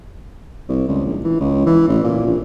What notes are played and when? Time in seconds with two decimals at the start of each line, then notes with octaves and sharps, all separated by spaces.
0.69 C2
0.88 C#2
1.05 A#1
1.24 E3
1.40 C#2
1.66 E3
1.88 A1
2.04 A#2
2.26 A#1